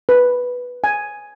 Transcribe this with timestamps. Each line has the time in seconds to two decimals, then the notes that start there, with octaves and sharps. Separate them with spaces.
0.09 B4
0.84 G#5